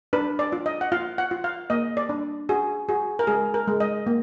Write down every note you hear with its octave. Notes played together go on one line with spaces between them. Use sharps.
D4 B4
D5
F4
D#5
F#5
F4 F5
F#5
F4
F5
A#3 D#5
D5
D4
F#4 G#4
F#4 G#4
A#4
G#3 G#4
A#4
G#3
D#5
A#3